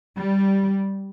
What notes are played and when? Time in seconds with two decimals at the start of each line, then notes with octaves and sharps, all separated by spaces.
0.16 G3